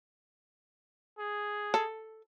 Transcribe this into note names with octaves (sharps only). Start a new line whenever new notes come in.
G#4
A4